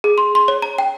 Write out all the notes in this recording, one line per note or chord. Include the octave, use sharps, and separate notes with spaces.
G#4
C6
C6
C#5
A#5
G5